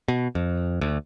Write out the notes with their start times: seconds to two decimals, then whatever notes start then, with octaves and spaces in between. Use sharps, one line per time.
0.08 B2
0.35 F2
0.81 D2